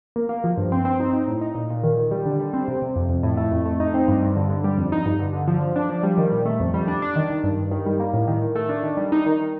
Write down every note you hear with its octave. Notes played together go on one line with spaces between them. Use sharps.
A#3
A#3
F3
G2
C4
C4
D#4
D#4
A2
D#4
A#2
A#2
D#3
D#3
G3
D3
G3
C4
C3
C3
F2
F2
A2
A3
F2
A3
D#4
C4
G2
G2
D3
D3
G3
F2
D#4
G2
D3
D3
F3
F3
D4
F3
G3
D#3
A#2
A3
F2
G3
D4
D4
D#3
D#3
G2
G2
D#3
G3
A#3
A2
D#3
D#3
A3
D4
D#3
G3
D#4
D#3
D#3